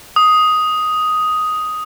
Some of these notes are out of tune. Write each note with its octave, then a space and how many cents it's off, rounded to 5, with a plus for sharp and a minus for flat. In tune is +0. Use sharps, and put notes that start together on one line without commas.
D#6 +5